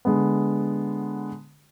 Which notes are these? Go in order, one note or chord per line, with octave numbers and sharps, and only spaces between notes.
D3 G#3 B3